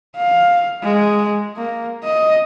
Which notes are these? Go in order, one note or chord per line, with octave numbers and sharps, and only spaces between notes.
F5
G#3
A#3
D#5